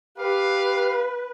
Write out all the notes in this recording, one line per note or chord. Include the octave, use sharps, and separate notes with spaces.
G4 B4 F5